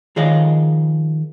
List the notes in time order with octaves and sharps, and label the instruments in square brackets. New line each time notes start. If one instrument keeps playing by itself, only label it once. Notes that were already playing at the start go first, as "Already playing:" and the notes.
[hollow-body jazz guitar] D#3 F3 G#4 C#5 D#5 F5